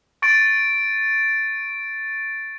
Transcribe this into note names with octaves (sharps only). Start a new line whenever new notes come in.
C#6 A6 D7